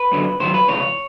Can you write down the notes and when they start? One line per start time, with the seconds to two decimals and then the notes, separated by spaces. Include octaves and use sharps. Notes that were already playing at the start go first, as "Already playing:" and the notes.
Already playing: B4
0.12 F#2 D3 F#3
0.40 G#2 D#3 F#3 C5
0.54 B4
0.68 C#2 C3 E3 C#5